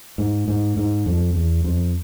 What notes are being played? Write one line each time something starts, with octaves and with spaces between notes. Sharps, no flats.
G#2
G#2
G#2
F2
E2
F2